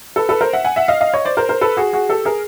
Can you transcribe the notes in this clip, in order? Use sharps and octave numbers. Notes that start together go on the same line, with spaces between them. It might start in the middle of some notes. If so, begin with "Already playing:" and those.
A4 B4
A4 B4
A#4 C5
E5 F#5
F#5 G#5
E5 F#5
D#5 F5
D#5 F5
C#5 D#5
C5 D5
A#4 C5
A#4 C5
A4 B4
F#4 G#4
F#4 G#4
G4 A4
G#4 A#4